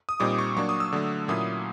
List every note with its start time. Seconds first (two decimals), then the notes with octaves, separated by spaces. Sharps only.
0.09 D#6
0.20 A#2 G3 C4 D#4 D6
0.38 C#6
0.56 F#3 A#3 D4 C#6
0.69 D#6
0.80 E6
0.92 D3 F#3 A3
1.28 A#2 F#3 A#3 C#4 E4 D#6